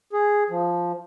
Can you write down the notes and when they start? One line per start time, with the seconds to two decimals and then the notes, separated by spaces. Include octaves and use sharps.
0.13 G#4
0.50 F3